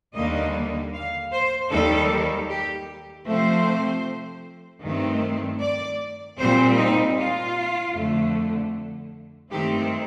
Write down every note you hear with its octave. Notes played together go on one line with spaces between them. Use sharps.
D#2 D3 G3 A#3 D#5
F5
C5
D#2 D#3 G3 A4
G4
C3 F3 A3 C4 C5
G2 D#3 A3 C4
D5
A#2 G3 C4 C5
D#4
F4
F2 D3 A3
G2 D#3 A3 C4 G4